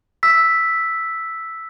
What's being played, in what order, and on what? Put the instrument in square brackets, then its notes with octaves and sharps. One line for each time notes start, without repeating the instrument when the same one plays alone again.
[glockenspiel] E6 B6